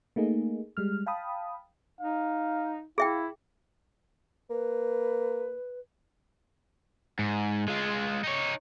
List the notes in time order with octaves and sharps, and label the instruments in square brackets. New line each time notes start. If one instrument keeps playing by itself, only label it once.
[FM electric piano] A3 A#3 D#4 G#4
G3 G#3 F6
F5 G5 A5 B5 D#6
[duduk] D#4 [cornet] F5
[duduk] E4 [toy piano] G#4 E5 G5 [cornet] F5
[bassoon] A#3 [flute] B4
[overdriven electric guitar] G#2
G#3 F4
D#4 C#5